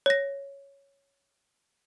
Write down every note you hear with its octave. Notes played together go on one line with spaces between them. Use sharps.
C#5 A#6